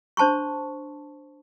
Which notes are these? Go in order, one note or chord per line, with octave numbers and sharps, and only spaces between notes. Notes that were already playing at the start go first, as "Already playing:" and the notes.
D4 C5 A5 C6 C#6